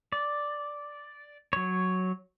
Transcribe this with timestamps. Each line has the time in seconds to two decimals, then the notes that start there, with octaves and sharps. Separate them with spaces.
0.12 D5
1.53 F#3 C#5